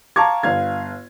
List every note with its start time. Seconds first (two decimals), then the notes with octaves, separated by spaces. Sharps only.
0.16 F5 A5 A#5 C#6 D6 G#6
0.43 G1 F5 G#6